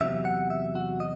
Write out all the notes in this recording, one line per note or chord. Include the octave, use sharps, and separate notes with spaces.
E2 C3 F#3 E5
F#5
E5
F#4
D#5